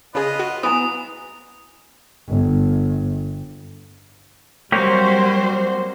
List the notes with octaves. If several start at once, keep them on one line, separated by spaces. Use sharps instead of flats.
C#3 F4 G#4 B4 D#5
F#4
B3 E4 G#5 A#5 D#6
G1
F#3 G3 A#3 C4 F#4 G4 C5 C#5